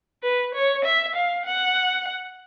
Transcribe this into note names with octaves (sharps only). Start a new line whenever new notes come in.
B4
C#5
E5
F5
F#5